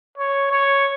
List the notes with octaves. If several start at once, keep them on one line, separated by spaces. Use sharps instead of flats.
C#5
C#5